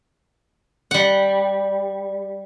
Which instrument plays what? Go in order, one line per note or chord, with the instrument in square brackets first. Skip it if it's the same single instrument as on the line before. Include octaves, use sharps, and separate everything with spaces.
[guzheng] G3 F#5